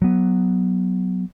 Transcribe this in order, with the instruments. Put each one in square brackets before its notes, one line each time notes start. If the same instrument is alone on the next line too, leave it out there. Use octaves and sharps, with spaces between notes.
[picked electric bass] F#3 B3